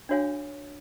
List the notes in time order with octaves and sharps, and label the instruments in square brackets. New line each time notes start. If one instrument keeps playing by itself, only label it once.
[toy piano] D4 F#4 C#5 F5 G#5